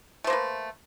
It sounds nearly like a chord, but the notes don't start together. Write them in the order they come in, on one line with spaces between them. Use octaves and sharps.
A3 C5 A#3 B4